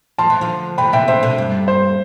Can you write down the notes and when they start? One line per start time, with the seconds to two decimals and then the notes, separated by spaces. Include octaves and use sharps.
0.18 F3 A5 C6
0.30 E3
0.41 D3 F3
0.78 C3 E3 G5 B5
0.93 C3 E3 E5 G5
1.08 C3 E3 C5 E5
1.23 B2 D3
1.38 G2
1.68 C5